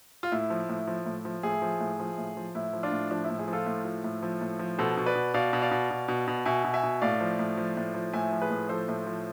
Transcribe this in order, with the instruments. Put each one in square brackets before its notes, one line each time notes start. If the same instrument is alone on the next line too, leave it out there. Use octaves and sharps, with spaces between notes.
[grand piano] F4
A2 E4
F3
A2
F3
A2
F3
A2 E4 G#4
F3
A2
F3
A2
F3
A2 E4
F3
D4 F4
A2
F3 D4
A2 E4
E4 G#4
F3
F4 A4
A2
F3
A2
F3
A2
F3
B2 A4 C5
B2
B4 D5
B2
B2 D5 F5
B2
D5 F5
B2
B2
B2
B2
B2 E5 G#5
B2
E5 G#5
B2
A2 D5 F5
F3
A2
F3
A2
F3
A2 E5 G#5
F3
G#4 B4
A2
F3 A4 C5
A2
F3